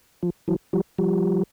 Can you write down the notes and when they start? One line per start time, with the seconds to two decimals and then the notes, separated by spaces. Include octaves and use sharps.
0.23 F3
0.48 E3 F#3
0.73 F3 G3
0.98 F3 G3